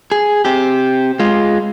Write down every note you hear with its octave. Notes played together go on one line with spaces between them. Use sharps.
G#4
C4 G4
G#3 F4